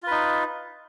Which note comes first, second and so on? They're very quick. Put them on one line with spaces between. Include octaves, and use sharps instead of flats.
F4 B4 D#4